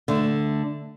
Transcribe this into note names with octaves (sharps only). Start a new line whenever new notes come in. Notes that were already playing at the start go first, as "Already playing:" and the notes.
D3 A3